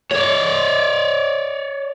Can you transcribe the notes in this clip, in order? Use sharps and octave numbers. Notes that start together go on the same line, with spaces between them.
C#5 D5